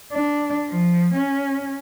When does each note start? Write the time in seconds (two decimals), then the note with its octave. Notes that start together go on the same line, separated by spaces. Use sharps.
0.12 D4
0.69 F3
1.14 C#4